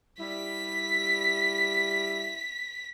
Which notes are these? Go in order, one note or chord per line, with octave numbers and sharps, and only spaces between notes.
G3 E4 B6